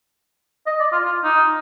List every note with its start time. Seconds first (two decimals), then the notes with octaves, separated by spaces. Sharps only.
0.67 D#5
0.80 D5
0.92 F4
1.05 F4
1.24 D#4